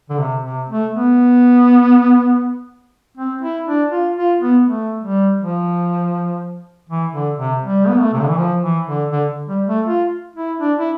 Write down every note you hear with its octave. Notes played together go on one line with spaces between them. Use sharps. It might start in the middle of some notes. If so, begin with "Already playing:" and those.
D3
C3
C3
A3
B3
C4
E4
D4
F4
F4
B3
A3
G3
F3
E3
D3
C3
G3
B3
A3
C3
D3
E3
F3
E3
D3
D3
G3
A3
F4
E4
D4
E4